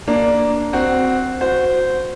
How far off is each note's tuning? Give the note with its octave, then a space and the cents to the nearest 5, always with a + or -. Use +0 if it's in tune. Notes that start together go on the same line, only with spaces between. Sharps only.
A#3 +0 D4 +0
C4 -10 F#4 +0
F#4 -20 C5 -15